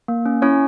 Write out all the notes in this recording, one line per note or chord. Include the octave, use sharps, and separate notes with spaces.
A#3
C#4
C#4 E4 C#5